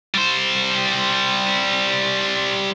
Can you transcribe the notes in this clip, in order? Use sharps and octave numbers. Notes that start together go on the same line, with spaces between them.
G3 C5